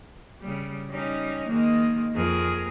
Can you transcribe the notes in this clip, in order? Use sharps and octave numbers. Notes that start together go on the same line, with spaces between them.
C#3 G3
G3 C#4 D#4
D#3 G#3 A#3
F2 G#4 A#4